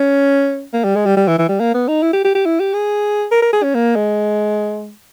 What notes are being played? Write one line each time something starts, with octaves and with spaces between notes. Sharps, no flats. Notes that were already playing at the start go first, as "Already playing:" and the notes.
Already playing: C#4
A#3
G3
G#3
G3
G3
E3
E3
G3
A#3
B3
D#4
E4
G4
G4
G4
E4
G4
G#4
A#4
A#4
G#4
C#4
A#3
G#3